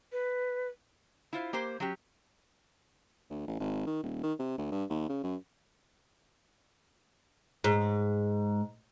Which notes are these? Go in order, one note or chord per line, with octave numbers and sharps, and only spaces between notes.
B4
E4 F4 C5
A#3 G4 C5
F#3 C#4 G4
D2
A1
G#1
D#3
D#1
D#3
C3
D2
G2
D#2
C#3
F#2
G#2